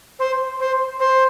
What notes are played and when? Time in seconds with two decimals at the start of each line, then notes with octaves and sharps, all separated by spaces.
0.19 C5
0.60 C5
1.00 C5